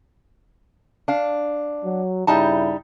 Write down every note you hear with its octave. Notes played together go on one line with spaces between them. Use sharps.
D4 F5
F#3
G2 C#3 G3 D#4 E4 A5